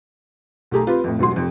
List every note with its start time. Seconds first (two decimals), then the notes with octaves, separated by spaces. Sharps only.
0.71 B1 A3 G4 G#4 A#5
0.87 C4 F4 G4 B4
1.04 F2 A2
1.19 E1 A1 F#3 C6
1.36 F1 F2 C4